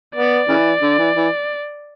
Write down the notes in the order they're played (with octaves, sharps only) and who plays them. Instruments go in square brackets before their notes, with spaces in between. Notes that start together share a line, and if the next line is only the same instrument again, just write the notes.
[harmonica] B3 [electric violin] D5
[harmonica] C#3 E3
D3
E3
E3